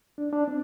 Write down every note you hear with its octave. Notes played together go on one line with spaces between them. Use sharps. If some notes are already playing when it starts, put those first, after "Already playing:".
D4
D4
C4